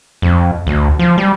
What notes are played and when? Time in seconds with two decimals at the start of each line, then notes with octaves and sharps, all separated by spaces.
0.22 F2
0.67 D2
0.99 F3
1.18 G3